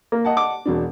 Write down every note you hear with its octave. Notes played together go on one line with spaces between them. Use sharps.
A#3
D#5 F#5 A5
D6
E1 B2 D4